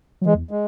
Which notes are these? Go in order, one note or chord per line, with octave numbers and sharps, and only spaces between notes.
F#3
E3 G#3
E2
G#3